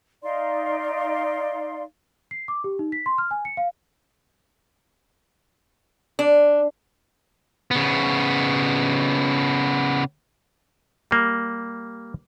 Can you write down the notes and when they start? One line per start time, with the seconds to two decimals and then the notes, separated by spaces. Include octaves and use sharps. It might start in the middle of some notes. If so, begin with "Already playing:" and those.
0.23 D#4 D5 F5 C6
2.31 C7
2.48 D6
2.64 G4
2.79 D#4
2.92 B6
3.06 C6
3.18 F6
3.31 G#5
3.45 C#7
3.57 F5
6.19 D4
7.71 C#3 B3
11.11 G3 A#3